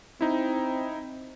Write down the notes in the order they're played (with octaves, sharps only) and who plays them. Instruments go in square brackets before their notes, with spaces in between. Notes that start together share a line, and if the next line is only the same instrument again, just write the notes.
[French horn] C4 [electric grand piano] D#4 E4